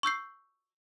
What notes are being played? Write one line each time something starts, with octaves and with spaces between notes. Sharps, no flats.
C#6 E6 G6 C7